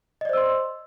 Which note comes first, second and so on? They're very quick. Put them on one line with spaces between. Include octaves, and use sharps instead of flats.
D#5 D5 C5 E6 C6